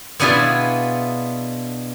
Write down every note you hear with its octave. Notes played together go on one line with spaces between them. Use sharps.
B2 B3 D4 E4 F4 G#4